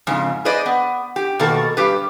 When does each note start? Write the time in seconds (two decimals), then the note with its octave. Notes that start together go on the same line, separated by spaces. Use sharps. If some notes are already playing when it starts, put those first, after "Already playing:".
0.07 F2 G#2 C#3
0.45 G#4 B4 C5 D5 D#5
0.66 B3
1.16 G4
1.39 B2 D#3 A#3 F#4 A4
1.77 G2 G4 B4